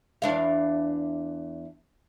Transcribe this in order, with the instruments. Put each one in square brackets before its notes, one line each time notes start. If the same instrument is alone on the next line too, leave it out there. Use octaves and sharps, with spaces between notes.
[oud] E2 D4 F5